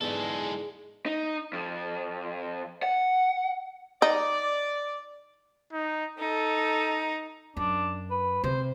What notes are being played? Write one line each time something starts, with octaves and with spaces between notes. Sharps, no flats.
E2 G#2 D3 G#3 G#4 A4
D#4
F2
F#5
D#4 D5
D#4
D#4 A4
F#2 D4
B4
C3 C5